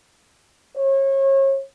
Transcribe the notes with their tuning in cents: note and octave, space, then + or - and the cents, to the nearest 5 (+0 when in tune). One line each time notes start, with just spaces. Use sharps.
C#5 -35